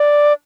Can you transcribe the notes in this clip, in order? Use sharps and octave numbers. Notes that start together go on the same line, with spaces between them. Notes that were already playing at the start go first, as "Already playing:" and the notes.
Already playing: D5